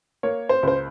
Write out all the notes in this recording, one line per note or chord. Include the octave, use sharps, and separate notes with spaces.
A#3 C#5
C5
C#2 C5